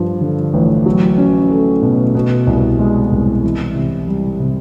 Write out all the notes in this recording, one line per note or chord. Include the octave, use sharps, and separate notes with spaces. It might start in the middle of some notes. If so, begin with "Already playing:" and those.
Already playing: G2 F3
D3
A1
F#3
C#4
A3
B2
B2
C2
G#3
C2
E3
C3
G3
C3